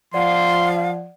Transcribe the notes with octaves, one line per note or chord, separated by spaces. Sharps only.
F3 D5 F5 F#5 C6